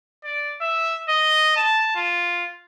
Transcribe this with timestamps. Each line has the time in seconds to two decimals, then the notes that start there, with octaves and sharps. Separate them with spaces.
0.24 D5
0.61 E5
1.09 D#5
1.56 A5
1.96 F4